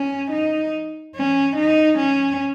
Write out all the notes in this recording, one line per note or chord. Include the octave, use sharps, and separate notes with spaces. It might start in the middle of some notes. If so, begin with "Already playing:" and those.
Already playing: C#4
D#4
C#4
D#4
C#4